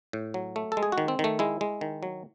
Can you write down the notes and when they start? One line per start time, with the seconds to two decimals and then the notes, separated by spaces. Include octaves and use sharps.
0.13 A2
0.34 F#3
0.56 A3
0.72 A4
0.77 G#3
0.83 G#4
0.92 F#4
0.98 D#3
1.08 C4
1.19 D#3
1.24 A3
1.39 G#3 E4
1.61 G#3
1.81 D#3
2.03 F#3